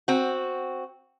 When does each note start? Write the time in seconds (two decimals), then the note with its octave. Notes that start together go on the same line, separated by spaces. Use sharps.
0.08 C4 F#4